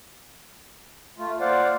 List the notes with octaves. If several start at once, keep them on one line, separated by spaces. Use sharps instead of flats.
A3 F4
A#3 F4 C5 D5 F5 F#5